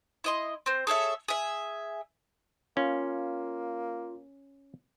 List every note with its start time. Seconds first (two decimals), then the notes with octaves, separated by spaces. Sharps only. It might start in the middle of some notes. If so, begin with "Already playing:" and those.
0.24 E4 D#5 C6
0.66 C4 C5
0.87 G#4 A4 C#5 E5
1.28 G#4 E5
2.77 A#3 C#4 F4